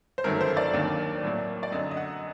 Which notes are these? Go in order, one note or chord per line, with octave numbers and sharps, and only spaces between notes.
C5
G1 F#2 D#3 F#3 A3 A#4
C5
D5
D#2 D#3 F#3 A#3 D4
A2 F#3 A#3
D5
F#2 D3 F#3 D#5
D#5
F#5